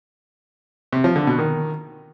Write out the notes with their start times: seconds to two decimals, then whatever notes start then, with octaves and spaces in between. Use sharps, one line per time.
0.93 C3
1.04 F3
1.16 D3
1.27 B2
1.39 D#3